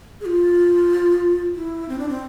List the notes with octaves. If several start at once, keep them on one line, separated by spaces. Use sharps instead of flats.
G#4
F4
E4
C4
D4
C4